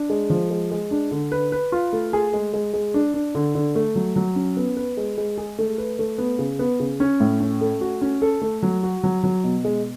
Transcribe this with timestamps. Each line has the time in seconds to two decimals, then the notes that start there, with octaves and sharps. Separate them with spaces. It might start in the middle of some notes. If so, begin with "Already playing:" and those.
Already playing: D4
0.10 G#3
0.30 F3
0.50 G#3
0.71 G#3
0.91 D4
1.11 D3
1.32 B4
1.52 B4
1.72 F4
1.93 A3
2.13 G#4
2.33 G#3
2.54 G#3
2.74 G#3
2.94 D4
3.14 D4
3.35 D3
3.55 D3
3.75 A3
3.96 F#3
4.16 F#3
4.36 C#4
4.57 B3
4.77 B4
4.97 G#3
5.18 G#3
5.38 G#4
5.59 A3
5.78 B4
5.99 A3
6.18 B3
6.39 C#3
6.59 B3
6.80 C#3
7.00 C#4
7.20 A2
7.40 C#4
7.61 A3
7.81 F#4
8.02 C#4
8.22 A4
8.42 A3
8.63 F#3
8.83 F#4
9.04 F#3
9.24 F#3
9.44 B2
9.65 G#3